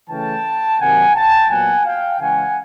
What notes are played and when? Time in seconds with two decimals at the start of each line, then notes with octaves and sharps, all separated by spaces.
0.09 C#3 E3 A3 C#4 G5 A5
0.79 C3 D#3 F#3 A#3 F#5 G#5
1.15 G5 A5
1.50 A#2 F#3 B3 F#5 G#5
1.85 F5 G5
2.20 C#3 E3 G#3 C#4 F#5 G#5